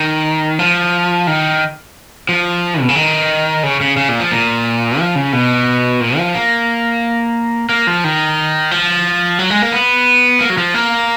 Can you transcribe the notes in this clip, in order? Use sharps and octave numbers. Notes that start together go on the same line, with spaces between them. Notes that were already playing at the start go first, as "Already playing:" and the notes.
Already playing: D#3
F3
D#3
F3
B2
C#3
D#3
C#3
C#3
C#3
A#2
F3
A#2
F3
C#3
B2
A#2
F3
A#3
A#3
F3
D#3
F3
F#3
G#3
A#3
B3
A#3
F#3
F3
A#3